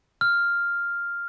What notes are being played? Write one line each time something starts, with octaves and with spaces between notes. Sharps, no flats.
F6